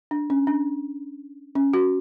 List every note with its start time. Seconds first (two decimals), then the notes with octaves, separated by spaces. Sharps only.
0.11 D4
0.30 C#4
0.47 D4
1.55 C#4
1.74 F#4